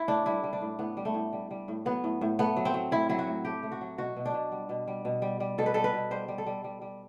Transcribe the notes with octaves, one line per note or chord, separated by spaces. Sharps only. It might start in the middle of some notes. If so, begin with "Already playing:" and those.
Already playing: E4
A2 D4
G3 E4
G3
D4
A2
A2 B3
G3
A3
A2
G3
G3
A2
F#3 B3
A2
A2
A3 B3
F#3
C4
F#3
A2 E4
F#3 E4
F#4
A2
A3 G4
A3
F#4
F#3
B2 F#4
B2
D4
B2
G3
B2
G3
B2
G3
G3
B2 A4
B4
G3 A4
B4
B2
G3 C5
G3
A4
G3
G3
G3